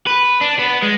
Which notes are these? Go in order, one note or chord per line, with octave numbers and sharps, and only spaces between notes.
B4
D4
B3
G#3